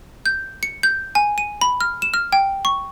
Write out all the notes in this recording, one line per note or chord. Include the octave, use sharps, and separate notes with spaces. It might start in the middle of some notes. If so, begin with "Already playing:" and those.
G6
C#7
G6
G#5
D#7
B5
F6
E7
F6
G5
C#6